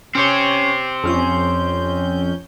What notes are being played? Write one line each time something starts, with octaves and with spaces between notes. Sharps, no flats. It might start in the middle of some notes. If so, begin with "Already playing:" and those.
C4 C#4 G4 C#5
F2 C#4 G6